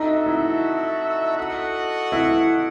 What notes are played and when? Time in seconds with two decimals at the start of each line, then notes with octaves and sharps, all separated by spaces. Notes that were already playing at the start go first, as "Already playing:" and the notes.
Already playing: D#4 F#4 A4 E5
0.26 E4
1.37 F#4 A4 D#5 F#5
2.12 E4